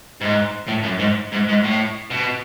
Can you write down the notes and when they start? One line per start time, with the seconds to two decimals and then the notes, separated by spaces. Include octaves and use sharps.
0.21 G#2
0.68 A2
0.83 F#2
0.99 G#2
1.32 G#2
1.48 G#2
1.64 A2
2.10 B2